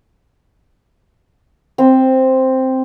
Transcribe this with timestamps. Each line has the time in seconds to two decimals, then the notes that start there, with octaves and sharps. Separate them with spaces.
1.78 C4